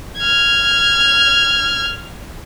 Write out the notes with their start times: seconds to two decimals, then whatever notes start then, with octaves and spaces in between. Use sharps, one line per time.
0.18 F6 G#6